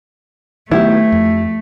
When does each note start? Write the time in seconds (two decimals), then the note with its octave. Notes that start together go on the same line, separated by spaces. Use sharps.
0.71 D#3 F#3 A3 B3 E4 G4
1.12 F2